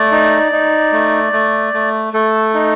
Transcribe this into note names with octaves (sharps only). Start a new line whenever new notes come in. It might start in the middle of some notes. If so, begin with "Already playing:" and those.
Already playing: A3 D5
D#4
D#4
A3
A3
A3
A3 A4
D#4